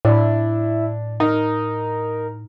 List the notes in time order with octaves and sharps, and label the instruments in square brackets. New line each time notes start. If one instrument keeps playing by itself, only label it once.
[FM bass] A2 [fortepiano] D4 [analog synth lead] E4
[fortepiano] D#4 [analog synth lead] A#4